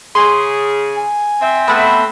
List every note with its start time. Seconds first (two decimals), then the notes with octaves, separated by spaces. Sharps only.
0.15 C#3 G#4 C6
0.96 G#5
1.41 C4 E5
1.68 A3 B3 F#5